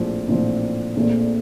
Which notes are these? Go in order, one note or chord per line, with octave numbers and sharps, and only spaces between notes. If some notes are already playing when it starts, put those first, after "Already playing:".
Already playing: A#1 A2 F3 C4
A#1 A2 F3 C4
A#1 A#2 A3 C4